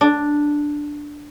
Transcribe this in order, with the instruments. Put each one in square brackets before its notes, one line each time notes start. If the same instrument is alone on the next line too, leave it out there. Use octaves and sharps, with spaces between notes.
[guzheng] D4